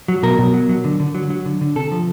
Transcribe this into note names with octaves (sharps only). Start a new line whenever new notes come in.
F#3
B2 A#4
B2
F#3
F#3
D3
D3
F#3
F#3
D3
D3
C3 A4
F3